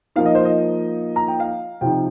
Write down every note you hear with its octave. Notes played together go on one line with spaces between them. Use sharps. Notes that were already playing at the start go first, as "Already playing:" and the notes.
F3 A#3 D#4 F5
D#5
C5
D#5
A#5
G5
F5
C3 F3 D#4 G5